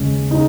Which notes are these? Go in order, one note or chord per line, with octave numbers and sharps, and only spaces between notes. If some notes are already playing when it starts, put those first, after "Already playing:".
Already playing: D#2 C#3 G#3 C#4
C#3 D#4